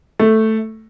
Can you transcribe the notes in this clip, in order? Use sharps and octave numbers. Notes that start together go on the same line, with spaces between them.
A3